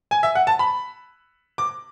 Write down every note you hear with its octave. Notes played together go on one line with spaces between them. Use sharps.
G#5
E5
F#5
A5
B5
D6